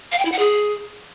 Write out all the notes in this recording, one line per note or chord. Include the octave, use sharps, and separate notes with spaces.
F5
G5
E4
F#5
G#4